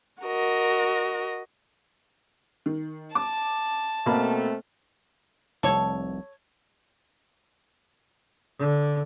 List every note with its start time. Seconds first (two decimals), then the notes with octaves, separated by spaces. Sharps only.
0.23 F#4 A#4 D#5
2.66 D#3
3.15 A5 D6
4.06 B2 A3 A#3 C4 B5
5.63 F1 C2 A4 C#5
8.59 D3